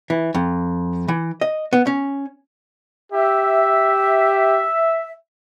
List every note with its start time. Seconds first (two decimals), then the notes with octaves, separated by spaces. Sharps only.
0.10 E3
0.35 F2
1.08 E3
1.41 D#5
1.73 B3
1.87 C#4
3.12 G4 E5